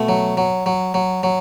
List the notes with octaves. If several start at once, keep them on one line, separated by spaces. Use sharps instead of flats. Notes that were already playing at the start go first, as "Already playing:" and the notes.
Already playing: B2 A3
F#3
F#3
F#3
F#3
F#3